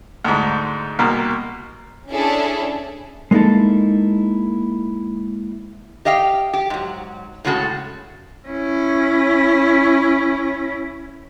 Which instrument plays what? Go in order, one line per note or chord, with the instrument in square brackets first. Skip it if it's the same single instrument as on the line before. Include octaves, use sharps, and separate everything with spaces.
[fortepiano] D2 G#2
C2 B2 A#3
[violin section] C#4 D4 E4 G#4 A4
[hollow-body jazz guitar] G#3 A#3 D#4 E4 A4
[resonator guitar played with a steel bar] G4 D#5 F5 G5
G4
G#2 F#3
A2 C#3 G#3 F#4 A4
[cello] C#4 E4